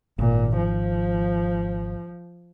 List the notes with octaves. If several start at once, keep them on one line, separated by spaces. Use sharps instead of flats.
G#1 A#2
F3